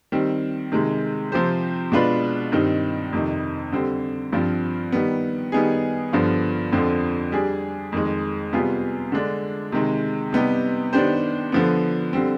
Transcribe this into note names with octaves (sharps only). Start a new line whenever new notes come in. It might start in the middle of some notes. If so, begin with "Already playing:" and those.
D#3 G3 C4
C3 D#3 G#3
C3 F3 C4 G4 C5
B2 G#3 D4 F4 B4
G2 D#3 G3 C4 D#4
F2 C3 D#3
D3 G3 C4
G2 F3 C4 F4
D#3 G3 B3
D#3 G3 B3 D#4 G#4
G2 D3 F3 B3 F4
F2 D3 F3 C4
G3 D4 G#4
F2 D#3 G#3
C3 G3 B3 F4 G#4
D3 G#3 D4
C3 D#3 G#3
C3 G3 B3 D#4 G4
D#3 B3 D4 G4 C5
D3 F3 B3
D3 G3 C4